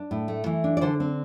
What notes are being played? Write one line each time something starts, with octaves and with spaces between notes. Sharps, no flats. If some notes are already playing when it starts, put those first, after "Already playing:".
Already playing: D4
A2
A3
E3
D4
D5
D3 A4 C5
C4